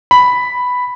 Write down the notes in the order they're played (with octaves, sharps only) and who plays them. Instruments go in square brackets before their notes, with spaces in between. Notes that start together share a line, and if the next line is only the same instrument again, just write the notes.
[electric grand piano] B5